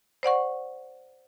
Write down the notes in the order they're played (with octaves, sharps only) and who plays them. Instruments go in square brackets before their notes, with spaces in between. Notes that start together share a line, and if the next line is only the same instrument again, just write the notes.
[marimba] C5 D5 F#5 C#6